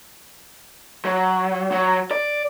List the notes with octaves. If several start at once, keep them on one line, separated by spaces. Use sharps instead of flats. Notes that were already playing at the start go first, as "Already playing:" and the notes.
F#3
F#3
D5